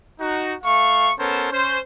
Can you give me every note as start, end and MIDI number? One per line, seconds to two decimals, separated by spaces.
0.20 0.54 63
0.20 0.54 66
0.64 1.12 57
0.64 1.12 77
0.64 1.12 85
1.19 1.48 59
1.19 1.48 61
1.19 1.48 69
1.19 1.48 70
1.19 1.48 72
1.52 1.78 61
1.52 1.78 72